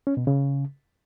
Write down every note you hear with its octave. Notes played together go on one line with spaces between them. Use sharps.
C#4
B2
C#3